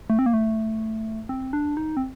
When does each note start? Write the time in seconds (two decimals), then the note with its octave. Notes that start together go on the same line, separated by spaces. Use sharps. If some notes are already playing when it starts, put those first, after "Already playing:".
0.10 A3
0.19 C4
0.26 A#3
0.34 A3
1.29 C4
1.53 D4
1.77 D#4
1.97 C4